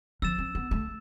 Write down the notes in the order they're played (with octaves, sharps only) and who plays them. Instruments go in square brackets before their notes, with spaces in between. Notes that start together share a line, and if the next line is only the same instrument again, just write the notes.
[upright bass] F3 [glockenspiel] E6 A6 E7
[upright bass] C4
B3
A3